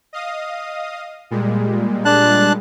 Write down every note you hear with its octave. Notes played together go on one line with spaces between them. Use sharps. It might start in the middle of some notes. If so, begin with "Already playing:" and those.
D#5 F5 D#6
A#2 G3 G#3
D4 A5 F#6